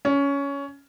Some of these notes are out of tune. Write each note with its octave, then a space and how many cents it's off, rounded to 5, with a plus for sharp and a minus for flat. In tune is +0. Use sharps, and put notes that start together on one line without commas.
C#4 +15